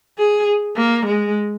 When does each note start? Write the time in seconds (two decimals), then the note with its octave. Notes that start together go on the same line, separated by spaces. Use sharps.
0.18 G#4
0.77 A#3
1.06 G#3